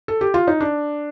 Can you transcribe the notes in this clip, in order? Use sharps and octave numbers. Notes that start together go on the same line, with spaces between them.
A4
G4
F4
D#4
D4